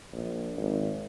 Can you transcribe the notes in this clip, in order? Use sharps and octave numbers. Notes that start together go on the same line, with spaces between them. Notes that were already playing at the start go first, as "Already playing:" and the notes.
A#1
G#1